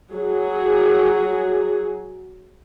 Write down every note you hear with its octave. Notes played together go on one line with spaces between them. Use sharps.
F#3 G#4